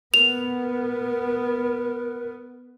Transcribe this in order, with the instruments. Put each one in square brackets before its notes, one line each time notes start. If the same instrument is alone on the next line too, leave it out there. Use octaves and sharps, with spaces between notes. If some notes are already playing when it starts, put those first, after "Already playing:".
[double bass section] B3 [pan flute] A#4 [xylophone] F7